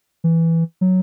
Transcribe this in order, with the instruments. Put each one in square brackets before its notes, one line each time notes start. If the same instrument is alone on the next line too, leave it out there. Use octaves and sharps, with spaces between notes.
[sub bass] E3
F#3